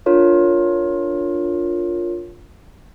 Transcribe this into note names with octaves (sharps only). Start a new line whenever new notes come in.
D4 F4 A#4 C#5